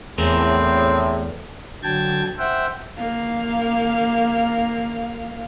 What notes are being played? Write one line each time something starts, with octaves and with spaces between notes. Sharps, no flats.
E2 A2 A3 C4 G#4 A#4
D3 F#3 G5 A5 G#6
C5 E5 F#5 G5
A#3 F5